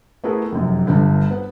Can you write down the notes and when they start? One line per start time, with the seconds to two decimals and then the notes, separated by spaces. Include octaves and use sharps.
0.24 A3 B3 E4 G#4 A#4
0.52 F1 F#2
0.87 G1 G2
1.31 B3